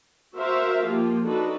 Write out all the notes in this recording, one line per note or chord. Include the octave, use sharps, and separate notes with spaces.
F#4 A#4 C5 E5 F5
F3 A#3 F4 G4
D4 D#4 F#4 A4 B4